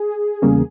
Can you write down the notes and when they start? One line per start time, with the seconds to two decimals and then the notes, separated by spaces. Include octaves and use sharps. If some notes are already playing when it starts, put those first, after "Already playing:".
Already playing: G#4
0.42 E2 C#3 G3 A#3 C#4